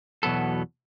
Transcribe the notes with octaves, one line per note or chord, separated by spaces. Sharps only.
E2 B2 F#3 B3 A4